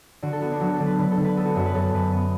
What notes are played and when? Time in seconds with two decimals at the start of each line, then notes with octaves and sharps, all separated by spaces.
0.22 D3 F#4
0.33 A4
0.42 B3 F#4
0.51 D4
0.60 F#3 F#4
0.74 A4
0.80 D3
0.86 B4
0.99 D3 B4
1.11 A4
1.17 D3
1.24 B4
1.37 B3 A4
1.46 F#4
1.56 F#2 F#4
1.66 B4
1.75 F#2 A4
1.94 F#2 B4
2.12 B3